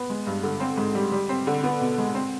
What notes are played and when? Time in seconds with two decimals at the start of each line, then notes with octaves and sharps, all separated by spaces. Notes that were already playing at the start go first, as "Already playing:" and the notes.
Already playing: B3
0.10 G#3
0.27 G2
0.43 D3
0.60 C4
0.77 G#2
0.95 G3
1.12 G3
1.29 C4
1.47 D3
1.63 B3
1.81 B2
1.98 G#3
2.15 C4